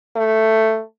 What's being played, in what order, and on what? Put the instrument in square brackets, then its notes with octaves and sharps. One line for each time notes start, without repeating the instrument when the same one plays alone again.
[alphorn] A3